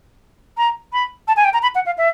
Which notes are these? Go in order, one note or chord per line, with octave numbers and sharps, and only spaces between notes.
A#5
B5
A5
G#5
G5
A#5
B5
F#5
F5
E5